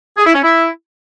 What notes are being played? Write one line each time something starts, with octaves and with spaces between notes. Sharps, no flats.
G#4
E4
C#4
E4